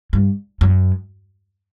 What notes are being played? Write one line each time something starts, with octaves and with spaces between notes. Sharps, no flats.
G2
F#2